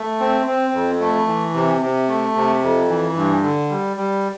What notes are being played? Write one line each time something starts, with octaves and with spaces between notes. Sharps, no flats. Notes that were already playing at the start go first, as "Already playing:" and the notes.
Already playing: A3
C4
C4
F2
A3
E3
C3
C3
A3
C3
F2
E3
G2
D3
G3
G3